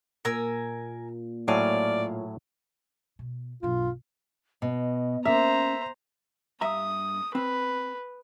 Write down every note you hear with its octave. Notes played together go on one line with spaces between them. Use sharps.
A#2 A#4 G#5 E6
A2 F#3 D5 F5 G#5
B2
B1 G2 F4
B2 D#5
A#3 C#4 C5 E5 A#5
G2 E5 A#5 D#6
C4 B4